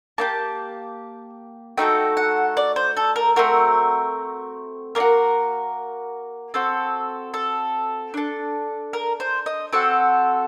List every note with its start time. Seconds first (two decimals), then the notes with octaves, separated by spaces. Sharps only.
0.18 A#3 D#4 G4 A5
1.78 A3 D#4 F#4 A4 G5
2.17 F#5
2.57 D5
2.76 C5
2.97 A4
3.16 A#4
3.36 A3 C4 F#4 A#4
4.95 A#3 D4 A#4
5.00 F#4
6.54 C4 F#4 A4
7.34 A4
8.14 D4 A4
8.93 A#4
9.20 C5
9.46 D#5
9.73 C4 F#4 A4 F#5